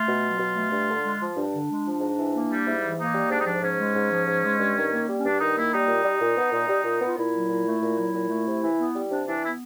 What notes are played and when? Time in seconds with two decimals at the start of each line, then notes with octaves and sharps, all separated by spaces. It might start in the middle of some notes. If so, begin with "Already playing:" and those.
Already playing: A3 F4
0.08 B2
0.24 F#3
0.39 B2
0.56 A3
0.72 G2
0.88 D3
1.04 G#3
1.20 F3
1.36 G2 D4
1.53 D3
1.69 G#3
1.84 F3
2.01 G#2
2.17 E3
2.33 A#3
2.50 G3
2.65 G#2 E4
2.82 E3
2.98 A#3 D#4
3.14 G3
3.30 G#2 D4
3.39 D#4
3.46 F3 D4
3.62 G#2 C#4
3.78 G#3
3.95 G#2
4.11 F3
4.27 G#2
4.42 G#3
4.59 G2
4.76 D#3
4.91 A#3
5.08 G3
5.19 C#4
5.23 G2 D4
5.39 D#3 D#4
5.55 A#3 E4
5.72 G3 D#4
5.88 A#2
6.04 G3
6.20 A#2
6.37 B3
6.52 A#2
6.69 G3
6.84 A#2
7.01 B3 F4
7.17 A#2 E4
7.33 F#3
7.49 A#2
7.66 A3
7.82 A#2
7.97 F#3
8.15 A#2
8.29 A3
8.47 C3
8.62 E3
8.79 B3
8.94 G3
9.11 C3 D4
9.27 E3 D4
9.42 B3 E4